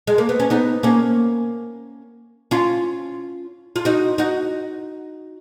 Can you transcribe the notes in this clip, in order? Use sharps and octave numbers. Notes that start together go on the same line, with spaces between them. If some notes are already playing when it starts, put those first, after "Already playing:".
G#3
A#3
B3
C#4
B3 D#4
A#3 C#4
C#4 F4
F4
D#4 F#4
D#4 F#4